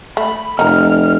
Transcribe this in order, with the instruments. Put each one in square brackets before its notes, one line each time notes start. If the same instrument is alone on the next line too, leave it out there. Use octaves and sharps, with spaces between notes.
[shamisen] A3 [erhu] B5
[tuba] F1 [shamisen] D#4 A#4 [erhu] F6